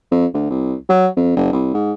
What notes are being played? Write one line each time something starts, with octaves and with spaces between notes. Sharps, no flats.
F2
D2
C2
F#3
F2
F#1
C2
G#2